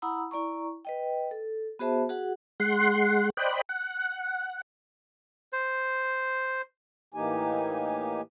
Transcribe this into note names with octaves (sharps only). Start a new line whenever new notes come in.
E4 F#5 A#5 B5 D#6 E6
E4 D5 A#5 C#6
B4 D#5 G5
A4
B3 F#4 G#4 C5 E5 A5
F#4 G#4 F#5
G#3 F#5 C6
C5 D5 D#5 G5 B5 F#6
F#5
C5
A2 E3 A#3 D#4 G4 G#5